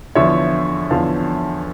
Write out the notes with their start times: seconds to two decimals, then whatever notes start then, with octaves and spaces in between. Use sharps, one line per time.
0.15 E2 D3 F3 C#5 E5
0.90 E2 D3 F3 F5 A5